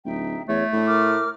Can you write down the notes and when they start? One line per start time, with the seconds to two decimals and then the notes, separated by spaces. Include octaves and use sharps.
0.05 D1 D#4 E5 G5
0.49 E2 A3 C#5
0.72 A2 D4
0.87 A#4 D6 F6